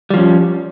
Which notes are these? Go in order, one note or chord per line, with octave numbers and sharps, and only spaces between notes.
F3 G3 C#4